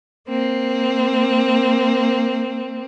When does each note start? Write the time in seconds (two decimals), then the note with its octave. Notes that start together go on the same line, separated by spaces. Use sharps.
0.27 A#3 C4